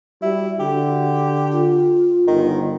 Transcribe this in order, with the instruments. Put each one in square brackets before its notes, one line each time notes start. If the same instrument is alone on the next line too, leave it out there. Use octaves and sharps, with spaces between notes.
[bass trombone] G3 [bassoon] E4 [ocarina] F#4
[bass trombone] D3 [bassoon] G4
[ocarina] F4
[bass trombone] G1 [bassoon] D#3